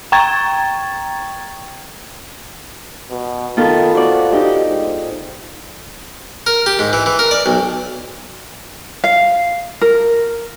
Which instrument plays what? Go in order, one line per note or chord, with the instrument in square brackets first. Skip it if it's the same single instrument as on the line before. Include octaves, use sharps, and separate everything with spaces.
[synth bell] G5 A#5 C#6 G#6 A6
[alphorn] B2
[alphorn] D#3 [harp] B3 F4 A4
[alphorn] F#4 [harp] C5 D5
[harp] D#4 [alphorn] G4
[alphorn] G#2
[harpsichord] A#4
G4
G#2
E3
E3
A#4
D5
B1
[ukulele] F5
A#4